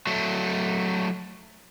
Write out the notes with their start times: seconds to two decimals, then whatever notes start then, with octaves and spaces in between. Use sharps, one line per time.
0.07 F#3 A3